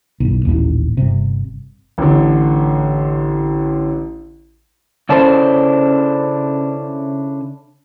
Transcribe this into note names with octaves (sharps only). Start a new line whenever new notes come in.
F#1 B1
D#1 A1
G1 C3
A1 D3
C#3 C#4 D4 E4 A4 C5